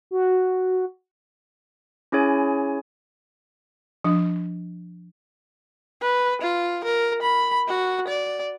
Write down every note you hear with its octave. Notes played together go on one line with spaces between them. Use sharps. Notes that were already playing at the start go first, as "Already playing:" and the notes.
F#4
C#4 E4 G#4 C#5 G#5
F3 D4
B4
F4
A#4
B5
F#4
D5